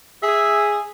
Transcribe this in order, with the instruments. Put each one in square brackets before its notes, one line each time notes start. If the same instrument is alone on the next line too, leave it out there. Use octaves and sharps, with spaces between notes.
[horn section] G#4 [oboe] E5